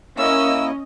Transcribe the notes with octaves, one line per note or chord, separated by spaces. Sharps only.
A#3 C#4 E4 D#5 E6